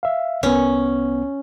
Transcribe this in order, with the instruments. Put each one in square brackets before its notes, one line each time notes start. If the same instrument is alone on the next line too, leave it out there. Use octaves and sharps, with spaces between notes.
[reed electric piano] E5 F5
[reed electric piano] C2 B3 [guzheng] C#4